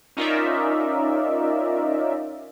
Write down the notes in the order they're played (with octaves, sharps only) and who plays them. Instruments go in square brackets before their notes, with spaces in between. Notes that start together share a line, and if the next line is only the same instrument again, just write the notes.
[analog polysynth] C#4 D#4 F4 A#4 D5 E5